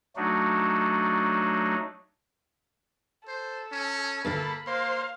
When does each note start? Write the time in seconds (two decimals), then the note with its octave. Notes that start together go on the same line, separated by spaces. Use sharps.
0.16 F#3 A3 D4 D#4 F#4
3.28 A4 C5
3.72 C#4
4.25 D2 G2 A#2 A#3 A4 B5
4.67 A#3 C5 F5